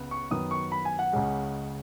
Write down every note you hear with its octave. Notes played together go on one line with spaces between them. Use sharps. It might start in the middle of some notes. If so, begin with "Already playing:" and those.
Already playing: C#2 C#3 B3
C#6
F#2 D#3 B3 D#6
C#6
B5
G#5
F#5
C#2 C#3 G#3 C#4